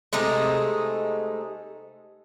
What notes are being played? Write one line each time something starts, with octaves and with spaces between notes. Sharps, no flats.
C3 G#3 A3 D#4